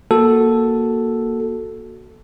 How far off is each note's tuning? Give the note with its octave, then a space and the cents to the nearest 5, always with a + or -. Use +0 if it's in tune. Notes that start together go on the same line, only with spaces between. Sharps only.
A#3 +5 F#4 +0 A4 +0